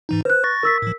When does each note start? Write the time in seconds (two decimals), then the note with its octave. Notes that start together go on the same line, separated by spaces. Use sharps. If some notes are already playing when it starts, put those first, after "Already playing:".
0.09 G#2 E3 D#4
0.25 B4 C5 F#6
0.44 C#6 A6 A#6
0.63 A#4 E6 B6
0.82 A2 F3